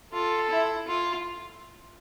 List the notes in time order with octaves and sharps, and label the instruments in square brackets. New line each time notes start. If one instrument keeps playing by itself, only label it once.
[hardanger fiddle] F4 [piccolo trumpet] A4
[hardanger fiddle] E4
F4